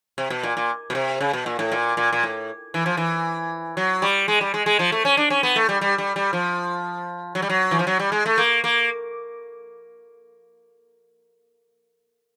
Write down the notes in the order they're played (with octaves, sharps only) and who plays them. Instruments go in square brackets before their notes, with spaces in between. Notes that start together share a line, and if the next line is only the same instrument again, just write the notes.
[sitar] C3
B2
A#2
A#2
B2
C3
C#3
B2
A#2
A2
A#2
A#2
A#2
A2
E3
F3
E3
F#3
G3
G#3
G3
G#3
G#3
F3
A3
C#4
D4
C#4
B3
A3
G3
G3
G3
G3
F3
F#3
G3
F#3
E3
F3
F#3
G3
G#3
A3
A#3
A#3